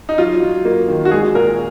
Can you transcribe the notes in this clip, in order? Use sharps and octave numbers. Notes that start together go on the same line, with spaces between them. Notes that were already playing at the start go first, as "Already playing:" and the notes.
D#4
F#3 F4
F#3
A#3
D#3
F#4
G#3 G#4
A#2 A#4